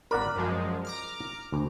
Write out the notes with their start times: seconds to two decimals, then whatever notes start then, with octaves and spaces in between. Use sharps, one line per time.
0.11 G#1 A#4 D5 F#5 B5
0.36 F#2 F3 G#3
0.85 A#5 D6 F6
1.52 D2